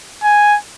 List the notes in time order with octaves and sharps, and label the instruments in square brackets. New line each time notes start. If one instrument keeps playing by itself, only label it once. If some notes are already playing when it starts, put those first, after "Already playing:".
[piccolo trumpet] G#5